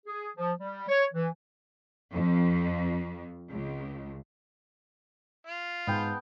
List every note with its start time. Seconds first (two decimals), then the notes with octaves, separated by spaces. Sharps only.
0.06 G#4
0.37 F3
0.60 G3
0.89 C#5
1.14 E3
2.12 F2
3.51 C#2
5.47 F4
5.87 G#2 B3 G5 A5